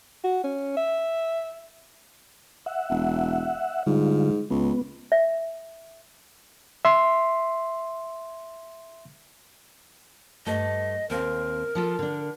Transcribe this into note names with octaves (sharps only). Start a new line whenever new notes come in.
F#4
C#4
E5
E5 F#5
E1
G#2 D3 G3 F4
C#2 B3
E5
E5 C6
G2 A3 D#5
D#2 C4 A#4 F5
F3 F4 A4
D3 D4